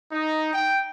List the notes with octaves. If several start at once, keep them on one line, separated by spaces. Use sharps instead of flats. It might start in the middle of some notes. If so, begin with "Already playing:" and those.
D#4
G5